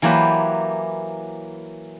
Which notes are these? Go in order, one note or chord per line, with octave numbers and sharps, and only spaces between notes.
E3 F#3 A#3 G4 B4 C5